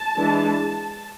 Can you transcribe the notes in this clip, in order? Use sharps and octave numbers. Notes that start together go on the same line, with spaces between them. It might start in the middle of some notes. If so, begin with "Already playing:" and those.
Already playing: A5
E3 G#3 D4